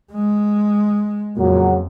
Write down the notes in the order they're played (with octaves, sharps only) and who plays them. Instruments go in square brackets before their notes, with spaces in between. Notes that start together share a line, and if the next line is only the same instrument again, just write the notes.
[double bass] G#3
[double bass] F2 [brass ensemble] A#2 C#3 F#3